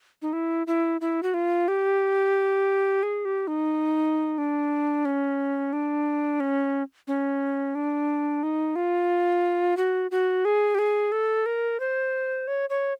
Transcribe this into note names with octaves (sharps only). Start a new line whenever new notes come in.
D#4
E4
E4
E4
F#4
F4
G4
G#4
G4
D#4
D4
C#4
D4
C#4
C#4
D4
D#4
F4
F#4
F#4
G#4
G4
G#4
A4
A#4
C5
C#5
C#5